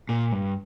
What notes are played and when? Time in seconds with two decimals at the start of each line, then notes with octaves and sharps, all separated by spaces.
0.09 A#2
0.32 G2